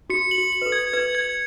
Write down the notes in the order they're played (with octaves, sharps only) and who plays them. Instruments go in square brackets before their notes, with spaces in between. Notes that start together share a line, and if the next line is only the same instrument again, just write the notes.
[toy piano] F#4 [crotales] C#7
[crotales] F#7
[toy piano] F#4
[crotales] F#7
[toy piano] B4
A4
[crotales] G#6
[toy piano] B4 [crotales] G#6
[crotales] G#6